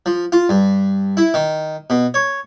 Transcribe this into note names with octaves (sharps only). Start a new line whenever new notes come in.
F3
F4
G2
E4
D#3
B2
C#5